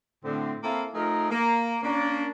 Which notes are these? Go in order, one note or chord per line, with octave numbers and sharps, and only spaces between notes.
A2 D3 C4
A#3 C4 E4 A4 F5
F3 A3 D#4 G#4 A#4
A#3
A#3 C#4 D4